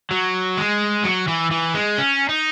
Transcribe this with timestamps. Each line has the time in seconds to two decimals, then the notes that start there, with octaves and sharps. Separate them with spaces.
0.11 F#3
0.57 G#3
1.04 F#3
1.28 E3
1.51 E3
1.74 G#3
1.98 C#4
2.29 D#4